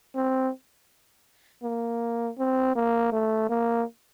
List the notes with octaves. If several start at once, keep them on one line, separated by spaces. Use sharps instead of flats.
C4
A#3
C4
A#3
A3
A#3